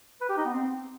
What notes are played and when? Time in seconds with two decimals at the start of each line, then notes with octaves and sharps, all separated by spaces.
0.21 B4
0.29 G4
0.37 D#4
0.45 B3
0.53 C4